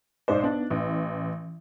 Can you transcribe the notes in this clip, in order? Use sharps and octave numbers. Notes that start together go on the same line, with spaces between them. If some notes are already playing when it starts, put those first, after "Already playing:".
B1 G#2 C5 D5
B3 D4 D#4
A1 E3